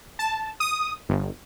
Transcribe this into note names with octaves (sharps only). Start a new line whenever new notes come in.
A5
D#6
G1